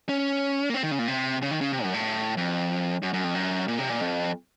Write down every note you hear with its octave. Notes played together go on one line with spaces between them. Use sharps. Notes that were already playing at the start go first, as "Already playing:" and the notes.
C#4
A#3
C4
D#3
C#3
A#2
C3
C#3
D#3
C#3
C3
F#2
A2
F2
F#2
F#2
F2
F#2
A#2
C3
A#2
F2